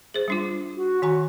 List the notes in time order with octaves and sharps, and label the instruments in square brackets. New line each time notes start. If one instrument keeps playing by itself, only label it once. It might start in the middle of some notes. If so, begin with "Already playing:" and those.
[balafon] G#4 C5
G3 D4 F4
[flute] F#4
[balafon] D#3 G#5 A#5 [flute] F#4